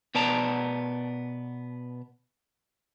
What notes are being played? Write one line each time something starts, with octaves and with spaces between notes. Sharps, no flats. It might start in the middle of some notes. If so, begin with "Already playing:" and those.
B2 B3 D5 A5 A#5